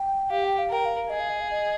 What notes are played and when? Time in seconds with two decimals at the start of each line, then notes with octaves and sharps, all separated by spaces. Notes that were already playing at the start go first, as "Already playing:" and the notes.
Already playing: G5
0.30 G4 F5
0.44 G5
0.58 F5
0.70 A#4 G5
0.85 F5
1.10 G#4 D#5
1.20 F5
1.29 D#5
1.41 F5
1.51 D#5